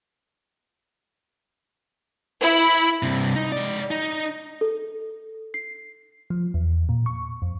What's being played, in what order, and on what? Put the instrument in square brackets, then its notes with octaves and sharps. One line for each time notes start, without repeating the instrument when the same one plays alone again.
[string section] E4
[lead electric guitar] G2 C3
D#4
G#3 D5
D#4
[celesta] A4
C7
[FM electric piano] F3
E2
A#2
C#6
F2